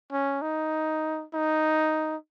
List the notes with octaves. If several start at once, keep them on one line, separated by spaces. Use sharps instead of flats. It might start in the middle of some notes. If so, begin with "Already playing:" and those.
C#4
D#4
D#4